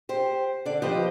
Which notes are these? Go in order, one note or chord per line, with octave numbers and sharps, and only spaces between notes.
G4 C5
D3 D4 D5
F3 G4 B4 C5 D#5 G5